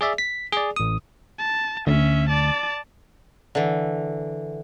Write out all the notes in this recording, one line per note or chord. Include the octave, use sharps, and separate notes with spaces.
G#4 D5 E5
B6
G#4 D5
A1 D#6
A5
D2 C#4 E5
D5 A5
D3 E3